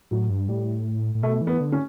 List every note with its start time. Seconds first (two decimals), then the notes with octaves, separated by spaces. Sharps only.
0.11 A2 F#3
0.30 G2
0.49 A2 G3
1.15 A2
1.22 B2 A3
1.41 E3
1.47 B3
1.60 D3
1.72 C#4